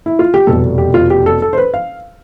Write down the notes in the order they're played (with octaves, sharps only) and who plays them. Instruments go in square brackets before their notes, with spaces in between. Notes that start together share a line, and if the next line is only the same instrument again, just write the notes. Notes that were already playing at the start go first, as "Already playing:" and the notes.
[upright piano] E4
F4
G4
F1 E2 B2 G3 A4
G4
F4
G4
A4
A4
C5
B4
F5